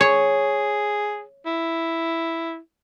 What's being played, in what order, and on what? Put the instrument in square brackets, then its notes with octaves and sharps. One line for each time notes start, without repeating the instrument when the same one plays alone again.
[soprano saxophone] G#4 [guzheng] C#5
[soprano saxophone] E4